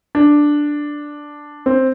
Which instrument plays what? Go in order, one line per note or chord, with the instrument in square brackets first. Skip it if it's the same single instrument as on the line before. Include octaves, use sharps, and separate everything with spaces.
[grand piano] D4
C4